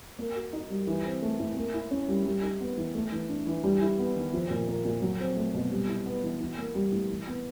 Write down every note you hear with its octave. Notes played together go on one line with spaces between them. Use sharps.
A#3
F#4
D#4
G3
E3
C4
A3
A2
A#3
E4
C#4
G3
G3
D#4
B3
E3
A3
E3
D4
E3
G3
E4
B3
D#3
F3
A#2
A#3
A#2
F#3
C4
A3
B2
G3
E4
B3
E3
E3
A#3
G3
A2
E3
B3